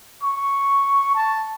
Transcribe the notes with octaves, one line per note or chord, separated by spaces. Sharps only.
C#6
A5